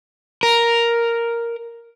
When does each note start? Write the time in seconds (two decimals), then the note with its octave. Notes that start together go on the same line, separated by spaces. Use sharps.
0.43 A#4